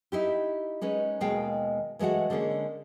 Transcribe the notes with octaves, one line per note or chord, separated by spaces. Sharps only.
D#4 E4 G4
G#3 C#4 D#4 B4
D#2 B2 G#3 F5 G5
E3 G#3 A3 F#4 F#5
D3 G#3 A#3 C#4